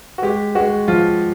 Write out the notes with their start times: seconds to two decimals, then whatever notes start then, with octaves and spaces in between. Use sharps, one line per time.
0.18 F#4
0.22 G#3 G4
0.55 G#3 F#4
0.88 F3 F4